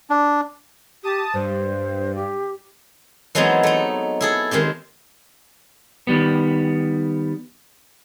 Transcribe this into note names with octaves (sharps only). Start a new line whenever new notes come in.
D4
G4 A5 D#6
G2 C5
G4
E3 F#3 G#3 B3 C4 D#4
A3 D#4
E4 G#4 A4
D#3 G#3 C4 G4
D#3 G3 B3